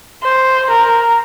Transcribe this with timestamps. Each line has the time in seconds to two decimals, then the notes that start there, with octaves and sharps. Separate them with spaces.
0.24 C5
0.70 A#4